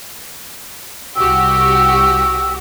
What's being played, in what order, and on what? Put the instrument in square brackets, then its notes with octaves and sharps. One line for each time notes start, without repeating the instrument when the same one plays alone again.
[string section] C2 F#4 G4 [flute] E6